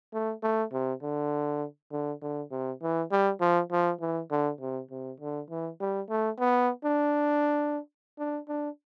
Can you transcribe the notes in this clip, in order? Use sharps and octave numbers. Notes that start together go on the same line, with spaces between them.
A3
A3
C3
D3
D3
D3
C3
E3
G3
F3
F3
E3
D3
C3
C3
D3
E3
G3
A3
B3
D4
D4
D4